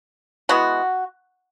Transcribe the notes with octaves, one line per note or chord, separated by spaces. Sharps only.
E3 G#3 B3 F#4